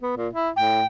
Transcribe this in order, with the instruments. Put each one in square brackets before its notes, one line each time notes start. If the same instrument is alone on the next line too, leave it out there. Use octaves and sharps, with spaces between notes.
[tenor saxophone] B3
A#2
E4
[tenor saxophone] A2 [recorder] G5